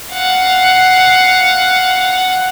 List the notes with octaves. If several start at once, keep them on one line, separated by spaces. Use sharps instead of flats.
F5 F#5